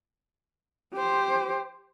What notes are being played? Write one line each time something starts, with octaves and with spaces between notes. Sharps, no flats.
G4 C5